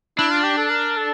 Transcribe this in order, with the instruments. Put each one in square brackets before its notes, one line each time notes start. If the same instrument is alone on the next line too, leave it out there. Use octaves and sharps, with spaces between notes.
[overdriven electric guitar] D4 [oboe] E4
[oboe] F4
G4
A4
A#4
A4